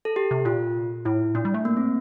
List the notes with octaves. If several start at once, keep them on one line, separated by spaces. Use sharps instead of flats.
A4
G4
C3
A#2 F4
A2 E4
A#2 D4
G3
A3
A#3
C4